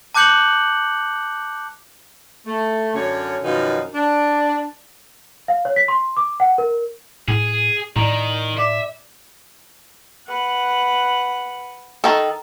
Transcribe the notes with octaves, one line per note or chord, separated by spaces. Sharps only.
A5 D6 F#6 G6 C#7 F#7
A3
F#2 D3 C#4 C#5
F#2 B2 D#3 F3 D#4 F4
D4
F5
C#5
B6
C6
D6
F#5
A#4
A2 G#4
A2 D#3 D5 A#5
D5 E5 D6
B4 F#5
D#3 A4